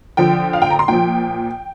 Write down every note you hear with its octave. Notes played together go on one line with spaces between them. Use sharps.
D3 F3 G5
F5
G5
A#5
C6
A#2 F3 G5